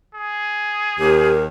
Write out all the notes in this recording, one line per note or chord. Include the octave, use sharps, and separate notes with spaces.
G#4
D#2 G4 A#4